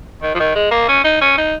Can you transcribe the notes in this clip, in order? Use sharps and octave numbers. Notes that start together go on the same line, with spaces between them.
D#3
F3
D#3
G#3
A#3
C#4
D#4
C#4
D#4